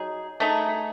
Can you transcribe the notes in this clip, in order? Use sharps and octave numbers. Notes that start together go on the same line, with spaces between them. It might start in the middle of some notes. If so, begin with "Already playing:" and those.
Already playing: F#3 D#4 G#4
A3 D#4 G#4